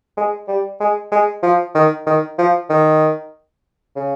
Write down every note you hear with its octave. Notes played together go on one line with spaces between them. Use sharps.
G#3
G3
G#3
G#3
F3
D#3
D#3
F3
D#3
C#3